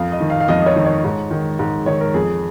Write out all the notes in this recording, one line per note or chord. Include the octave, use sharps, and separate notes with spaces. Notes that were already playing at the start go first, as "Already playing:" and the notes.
Already playing: F2 F5
D#5
D#3
F5
F5
F2 D#5
D#5
C#5
D#3
C#5
G#2
D#3
G#2
D#3 C#5
A#4
F2 G#4